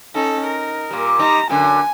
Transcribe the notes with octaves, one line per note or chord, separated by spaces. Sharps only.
C#4 D#4 A4
A#4
A#2 G3
G3 D#4 A#5
F#2 D3 G#5